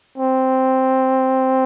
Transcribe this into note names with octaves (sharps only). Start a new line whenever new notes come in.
C4